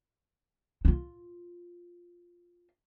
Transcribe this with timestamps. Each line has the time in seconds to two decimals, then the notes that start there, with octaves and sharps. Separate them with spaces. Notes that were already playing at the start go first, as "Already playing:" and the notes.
0.85 E4 F4